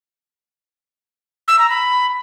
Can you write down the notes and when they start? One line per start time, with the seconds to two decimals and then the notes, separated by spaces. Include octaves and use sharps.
1.48 E6
1.59 A#5
1.70 B5